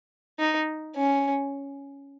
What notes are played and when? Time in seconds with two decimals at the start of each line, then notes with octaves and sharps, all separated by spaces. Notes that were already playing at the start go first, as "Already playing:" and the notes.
0.39 D#4
0.96 C#4